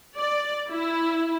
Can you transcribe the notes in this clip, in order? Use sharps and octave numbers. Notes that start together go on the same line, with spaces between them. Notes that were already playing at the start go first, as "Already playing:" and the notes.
D5
E4